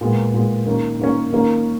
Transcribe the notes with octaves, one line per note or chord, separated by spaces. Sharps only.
A#2 G#3 B3
A#2 G#3 B3
D#3 A#3 C#4
D#3 A#3 C#4
D#3 A#3 C#4